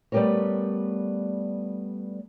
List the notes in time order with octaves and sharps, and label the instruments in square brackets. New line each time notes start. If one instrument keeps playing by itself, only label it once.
[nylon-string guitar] G3 A3 B3 G4 A#4 C#5